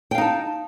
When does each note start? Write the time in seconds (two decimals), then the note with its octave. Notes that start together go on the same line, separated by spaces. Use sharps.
0.11 G5
0.15 F5
0.18 D#4
0.21 A5